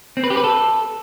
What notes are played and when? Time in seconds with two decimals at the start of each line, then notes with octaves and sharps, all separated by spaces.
0.17 C4
0.24 B4
0.30 G4
0.37 B4
0.44 A4